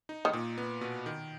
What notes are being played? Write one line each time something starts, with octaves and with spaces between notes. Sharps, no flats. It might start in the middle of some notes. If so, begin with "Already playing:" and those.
D#4
D#3
A#2
B3
B2
D#3